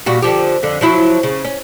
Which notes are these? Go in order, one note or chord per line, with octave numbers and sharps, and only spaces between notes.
A#2 G3 F#4
D3 F3 G4
F2 D3
F3 F#3 E4
C#3
C#4